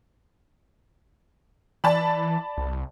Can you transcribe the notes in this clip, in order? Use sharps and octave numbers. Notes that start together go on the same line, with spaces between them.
E3 D5 A5 B5
C2